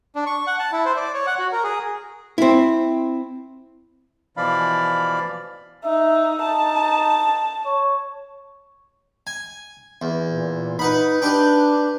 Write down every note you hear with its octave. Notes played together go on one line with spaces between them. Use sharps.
D4
C#6
F#5
A5
E4
C5
D5
C#5
F#5
F#4
A#4
G#4
C4 E4
B2 E3 F3 D5 F5 B5
D#4 E5
D#4 A5
C#5
G#5
E2
A#2
D#4 B4 F#5 B5
D4 G4 B4 G5